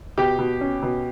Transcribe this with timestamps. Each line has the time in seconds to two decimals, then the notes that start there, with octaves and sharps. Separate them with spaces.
0.18 B2 G4
0.39 B2
0.61 C#4
0.82 B2